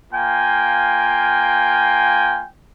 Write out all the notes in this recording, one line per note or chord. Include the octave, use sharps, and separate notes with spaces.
A#3 F4 G5 G#5